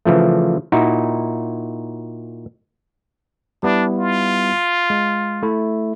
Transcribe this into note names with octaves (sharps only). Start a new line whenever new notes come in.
C#3 E3 F3 A3
A#2 D#4 E4 F#4
G3 B3 D4 E4
F4
G#3
A3 E4